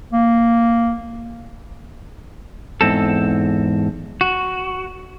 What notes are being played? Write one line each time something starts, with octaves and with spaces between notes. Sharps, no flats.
A#3
E2 G#2 C4 A4
F#4